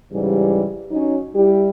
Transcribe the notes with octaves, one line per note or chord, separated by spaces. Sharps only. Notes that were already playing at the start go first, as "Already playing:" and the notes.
G#2 C#3 E3 G3
F#3 C#4 D#4
G3 E4 G4